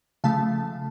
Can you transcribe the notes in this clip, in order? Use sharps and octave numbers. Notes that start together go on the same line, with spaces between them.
C#3 F3 A3 F5 A5